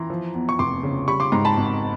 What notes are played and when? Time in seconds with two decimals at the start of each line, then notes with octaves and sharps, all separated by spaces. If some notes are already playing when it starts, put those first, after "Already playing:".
Already playing: E3 A#5 C6
0.10 F3
0.34 E2
0.49 C#6
0.59 F1 C6 D6
0.83 C#3
1.08 G3 B5 C#6
1.20 C6 D6
1.32 G#2 A#5 C6
1.45 A5 B5
1.57 G#1